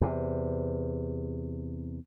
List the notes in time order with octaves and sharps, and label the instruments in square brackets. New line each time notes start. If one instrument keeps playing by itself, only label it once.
[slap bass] E2 C3